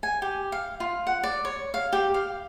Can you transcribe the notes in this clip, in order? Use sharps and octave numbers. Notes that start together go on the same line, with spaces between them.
G#5
G4
F5
F4
F#5
D5
C#5
F5
G4
F5